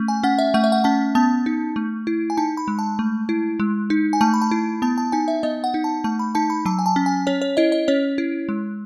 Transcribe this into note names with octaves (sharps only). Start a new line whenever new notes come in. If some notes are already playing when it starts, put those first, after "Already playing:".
Already playing: A3 C#4
G#5
C#4 F#5
E5
A3 F#5
E5
F#5
C#4 A5
B3 A5
D#4
A3
E4
G#5
D#4 A5
B5
G#3
A5
A3
E4
G#3
D#4
G#5
A3 A5
B5
A5
E4
B3 A5
A5
D#4 G#5
E5
B3 D#5
F#5
D#4
A5
A3 A5
B5
D#4 A5
B5
F#3 A5
G#5
A5
C#4
G#5
C#4 C#5
C#5
E4 D#5
D#5
C#4 C#5
E4
G#3